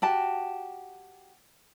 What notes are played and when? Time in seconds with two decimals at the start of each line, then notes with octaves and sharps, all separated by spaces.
0.02 F#4 G4 A5